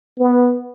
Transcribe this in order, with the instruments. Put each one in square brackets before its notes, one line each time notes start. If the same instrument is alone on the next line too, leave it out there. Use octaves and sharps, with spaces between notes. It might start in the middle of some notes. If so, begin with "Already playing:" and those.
[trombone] B3